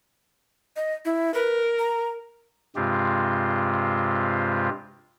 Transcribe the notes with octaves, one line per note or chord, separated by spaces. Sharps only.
D#5
E4
A#4 B4
A#5
G2 C3 G#3 C4 F4 G4